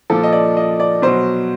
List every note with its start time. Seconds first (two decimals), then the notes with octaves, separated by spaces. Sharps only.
0.10 A#2 F3 A4
0.23 D#5
0.32 D5
0.57 D#5
0.80 D5
1.02 B2 F#3 C5